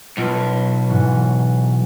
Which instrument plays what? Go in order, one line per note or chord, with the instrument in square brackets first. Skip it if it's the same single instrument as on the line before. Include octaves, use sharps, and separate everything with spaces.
[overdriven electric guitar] B1 [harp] F4 A4 B4
[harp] G#2 E3 F#4